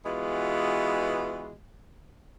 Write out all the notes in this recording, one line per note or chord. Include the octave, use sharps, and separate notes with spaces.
E3 G#3 B3 F4 F#4